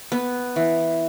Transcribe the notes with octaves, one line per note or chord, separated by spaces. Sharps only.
B3
E3